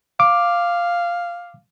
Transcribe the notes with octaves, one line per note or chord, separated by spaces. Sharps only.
F5 D6